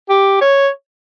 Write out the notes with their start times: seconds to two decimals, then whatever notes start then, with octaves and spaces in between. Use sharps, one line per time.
0.09 G4
0.41 C#5